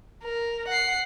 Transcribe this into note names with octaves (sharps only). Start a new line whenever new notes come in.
A#4
F#5 C7